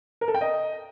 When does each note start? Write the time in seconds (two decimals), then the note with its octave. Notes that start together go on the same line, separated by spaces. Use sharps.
0.21 A#4
0.28 A4
0.34 G5
0.41 D#5